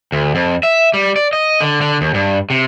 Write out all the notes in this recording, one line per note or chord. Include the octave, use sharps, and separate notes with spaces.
D2
F2
E5
G3
D5
D#5
D3
D3
D#2
G2
C3